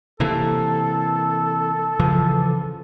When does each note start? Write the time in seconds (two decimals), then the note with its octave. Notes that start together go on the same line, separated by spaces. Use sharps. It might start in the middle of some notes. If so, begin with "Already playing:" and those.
0.20 C3 E3 A#3 A4
2.00 C#3 E3 F3